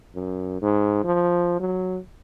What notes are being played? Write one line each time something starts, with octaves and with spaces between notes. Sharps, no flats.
F#2
G#2
F3
F#3